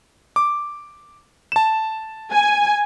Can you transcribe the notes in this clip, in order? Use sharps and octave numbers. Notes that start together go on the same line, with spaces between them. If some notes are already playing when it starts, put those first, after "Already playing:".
D6
A5 E7
G#5